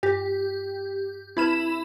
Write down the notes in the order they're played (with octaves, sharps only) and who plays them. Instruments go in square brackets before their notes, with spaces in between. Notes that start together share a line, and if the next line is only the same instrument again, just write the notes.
[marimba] G2 G6 [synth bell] G4
[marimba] C4 B4 F6 [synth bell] E4 B5 E7